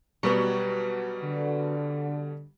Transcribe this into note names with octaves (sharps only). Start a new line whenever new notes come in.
B2 F#3 G3 B3 C#6
D3